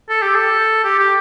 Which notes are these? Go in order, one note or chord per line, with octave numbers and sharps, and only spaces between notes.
A4
G4
A4
G4
G4